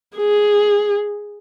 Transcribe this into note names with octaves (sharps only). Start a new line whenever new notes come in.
G#4